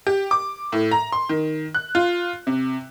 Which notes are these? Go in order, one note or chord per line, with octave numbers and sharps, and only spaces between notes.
G4
D6
A2
A#5
C6
D#3
F#6
F4
C3